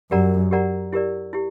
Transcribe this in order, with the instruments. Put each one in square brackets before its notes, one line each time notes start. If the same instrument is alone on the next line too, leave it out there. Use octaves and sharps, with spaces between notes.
[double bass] F#2 [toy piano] G4 A#4 D5 F#5 A#5
[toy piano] G4 A#4 D5 F#5 A#5
E4 G4 A#4 D5
E4 G4